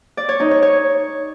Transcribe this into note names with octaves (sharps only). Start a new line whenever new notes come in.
D5
C#5
D#4
C#5
C#5